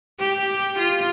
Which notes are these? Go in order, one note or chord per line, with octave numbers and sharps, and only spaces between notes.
G4
F4